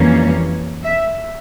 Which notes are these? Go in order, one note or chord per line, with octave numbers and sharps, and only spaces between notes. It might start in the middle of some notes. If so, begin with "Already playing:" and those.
Already playing: F2 E3 G3 A#3 C#4
E5